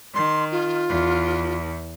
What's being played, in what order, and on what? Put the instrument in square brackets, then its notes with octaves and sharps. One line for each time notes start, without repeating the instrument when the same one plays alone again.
[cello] D#3 [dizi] C6
[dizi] F4
[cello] E2